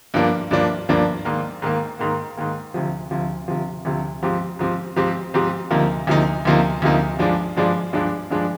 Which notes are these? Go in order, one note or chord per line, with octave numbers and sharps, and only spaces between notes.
G2 F3 A#3 D4
G2 F3 A#3 D4
G2 F3 A#3 D4
G#2 D#3 A#3
G#2 D#3 A#3
G#2 D#3 A#3
G#2 D#3 A#3
D2 C3 F3
D2 C3 F3
D2 C3 F3
D2 C3 F3
G#2 F3 C4 G4
G#2 F3 C4 G4
G#2 F3 C4 G4
G#2 F3 C4 G4
D2 C3 F3 A#3 D#4
D2 C3 F3 A#3 D#4
D2 C3 F3 A#3 D#4
D2 C3 F3 A#3 D#4
G2 F3 G#3 D4
G2 F3 G#3 D4
G2 F3 G#3 D4
G2 F3 G#3 D4